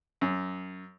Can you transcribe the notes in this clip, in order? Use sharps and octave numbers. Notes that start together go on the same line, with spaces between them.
F#2